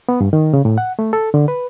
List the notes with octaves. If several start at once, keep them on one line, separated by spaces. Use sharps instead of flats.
B3
G2
D#3
C#3
A2
F#5
A3
A4
D3
B4